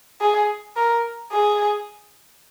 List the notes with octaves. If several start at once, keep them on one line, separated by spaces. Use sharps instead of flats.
G#4
A#4
G#4